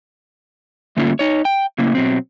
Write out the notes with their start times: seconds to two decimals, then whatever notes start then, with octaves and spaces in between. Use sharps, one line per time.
0.97 G2 D3 A3 A#3 C#4 F4
1.19 D#4 C#5
1.45 G5
1.78 A2 C#3 A#3 C#4
1.95 B2 F#3 C4